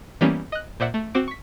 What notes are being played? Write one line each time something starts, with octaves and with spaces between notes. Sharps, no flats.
E3 G3 A#3 B3 C#4
D#5 F#6
A#2 C5 D5 E5 F#5
A3
C4 F#4 C5 D6 D7
C#6 B6